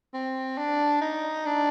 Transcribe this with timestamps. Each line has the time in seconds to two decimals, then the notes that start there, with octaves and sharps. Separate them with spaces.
0.14 C4
0.58 D4
1.01 D#4
1.46 D4